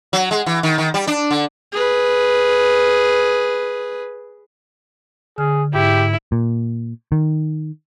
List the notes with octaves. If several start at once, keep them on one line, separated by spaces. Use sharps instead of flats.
F#3
G#3
E3
D#3
D#3
G3
D4
D3
G#4 B4
D3 G#4 F6
G#2 E4 G4
A#2
D#3